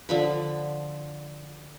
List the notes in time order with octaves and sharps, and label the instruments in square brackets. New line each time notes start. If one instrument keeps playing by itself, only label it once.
[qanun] D3 F3 B5